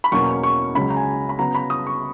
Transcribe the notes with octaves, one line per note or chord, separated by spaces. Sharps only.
B5
E2 B2 F#3 A#3 C#4 C#6
C#6
C#2 C#3 F#3 B5
A#5
G#5
B5
C#3 F#3 B3 A#5
B5
D#6
C#6